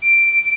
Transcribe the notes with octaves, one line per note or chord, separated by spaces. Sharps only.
D7